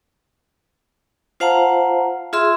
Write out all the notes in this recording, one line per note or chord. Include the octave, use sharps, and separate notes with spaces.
F4 C5 F5 F#5 A5 A#5
F4 G#4 E5 C6 E6